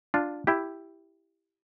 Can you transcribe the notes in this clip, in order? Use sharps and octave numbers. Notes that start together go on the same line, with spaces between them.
D4 F4
E4 G4